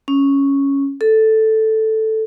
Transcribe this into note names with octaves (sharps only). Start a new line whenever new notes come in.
C#4
A4